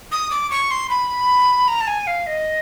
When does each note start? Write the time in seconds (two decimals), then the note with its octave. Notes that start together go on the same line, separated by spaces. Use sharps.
0.12 D#6
0.30 D6
0.50 C#6
0.71 C6
0.90 B5
1.68 A#5
1.81 A5
1.87 G#5
2.07 F5
2.27 D#5